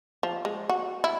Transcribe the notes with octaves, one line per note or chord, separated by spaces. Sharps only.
F3
G#3
F#4
E4